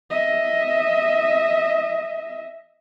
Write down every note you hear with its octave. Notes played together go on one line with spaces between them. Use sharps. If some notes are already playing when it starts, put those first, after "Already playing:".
D#5 E5